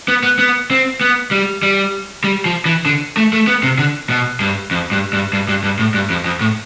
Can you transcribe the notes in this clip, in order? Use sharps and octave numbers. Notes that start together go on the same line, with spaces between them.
B3
B3
B3
C4
B3
G3
G3
G3
F3
E3
D3
A3
A3
B3
C3
D3
B2
G2
F2
G2
G2
G2
G2
G2
A2
G2
F2
F2
A2